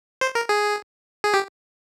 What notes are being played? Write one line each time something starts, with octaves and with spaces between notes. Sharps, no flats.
C5
A#4
G#4
G#4
G4